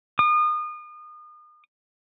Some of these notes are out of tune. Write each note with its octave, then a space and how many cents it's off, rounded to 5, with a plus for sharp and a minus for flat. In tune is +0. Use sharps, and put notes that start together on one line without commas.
D#6 -35